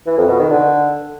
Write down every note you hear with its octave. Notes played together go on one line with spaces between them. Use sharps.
E3
F2
B2
D#3
D3